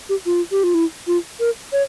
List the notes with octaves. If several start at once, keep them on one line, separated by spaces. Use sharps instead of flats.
G4
F4
G4
F4
E4
F4
A#4
C#5